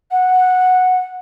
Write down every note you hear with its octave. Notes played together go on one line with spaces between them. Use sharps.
F#5